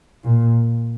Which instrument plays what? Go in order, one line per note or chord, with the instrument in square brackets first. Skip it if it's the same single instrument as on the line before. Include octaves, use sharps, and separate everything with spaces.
[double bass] A#2